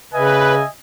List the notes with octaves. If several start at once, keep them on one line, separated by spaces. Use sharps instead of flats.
C#3 B4 D#5 E5 G#5